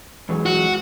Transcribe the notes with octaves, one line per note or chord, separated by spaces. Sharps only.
E2 F#3 G#3
F#4